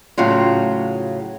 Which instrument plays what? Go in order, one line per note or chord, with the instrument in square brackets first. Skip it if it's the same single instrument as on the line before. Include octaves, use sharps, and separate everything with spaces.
[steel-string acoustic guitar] A2 C#3 F#3 F4